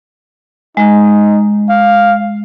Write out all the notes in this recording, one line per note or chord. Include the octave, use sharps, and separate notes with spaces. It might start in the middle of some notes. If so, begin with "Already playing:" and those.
G#3 D#4
F5